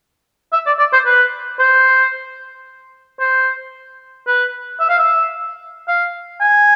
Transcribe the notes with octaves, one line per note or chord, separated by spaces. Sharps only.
E5
D5
D5
C5
B4
C5
C5
B4
E5
F5
E5
F5
G#5